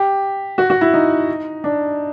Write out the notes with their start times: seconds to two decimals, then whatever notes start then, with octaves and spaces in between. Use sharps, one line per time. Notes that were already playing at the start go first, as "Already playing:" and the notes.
Already playing: G4
0.58 F#4
0.70 F#4
0.81 E4
0.93 D#4
1.64 D4